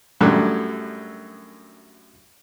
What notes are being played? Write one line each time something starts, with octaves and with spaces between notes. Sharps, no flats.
F#2 A2 D3 F#3 G3